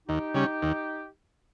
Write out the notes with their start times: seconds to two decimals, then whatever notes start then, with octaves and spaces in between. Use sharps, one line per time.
0.08 D#2 D#4 G4
0.34 C#3 G3 C#4
0.62 D#2